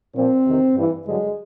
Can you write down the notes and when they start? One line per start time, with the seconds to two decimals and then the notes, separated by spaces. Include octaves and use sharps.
0.15 A#2 F3 C4
0.46 E2 C3 D#3
0.75 G2 E3
1.05 G2 D3 F#3 G#3